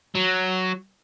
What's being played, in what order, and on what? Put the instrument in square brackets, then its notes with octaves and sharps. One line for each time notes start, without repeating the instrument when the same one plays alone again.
[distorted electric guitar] F#3